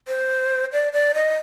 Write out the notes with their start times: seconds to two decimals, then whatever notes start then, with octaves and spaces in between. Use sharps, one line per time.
0.08 C5
0.72 D5
0.93 D5
1.15 D#5